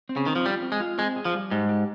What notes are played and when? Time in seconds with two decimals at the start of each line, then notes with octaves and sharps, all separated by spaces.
0.09 C4
0.17 C#3
0.26 D#3 C4
0.36 F3
0.46 G3 F4
0.63 C4
0.72 G#3
0.80 F4
0.98 G#3 C4
1.16 G#4
1.25 F3
1.34 G3
1.51 G#2 G4
1.69 G4